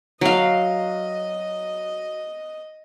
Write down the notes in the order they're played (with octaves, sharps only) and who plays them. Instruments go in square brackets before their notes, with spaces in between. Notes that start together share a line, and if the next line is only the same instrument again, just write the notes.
[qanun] F#3 F5 [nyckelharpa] D#5